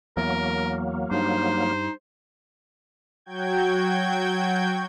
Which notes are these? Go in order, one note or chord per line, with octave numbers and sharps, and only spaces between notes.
E2 F#3 A#3 A#4
G2 D#4 C5
F#3 F#4 G5 G6 G#6